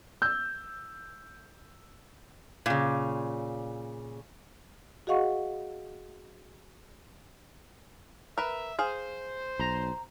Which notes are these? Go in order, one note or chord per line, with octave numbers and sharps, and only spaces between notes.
E6 G6
A#2 C#3
F#4 G#4 D#5 F5 F#5 C#6
A#4 B4 E5
G#4 C5 F5
B1 A#5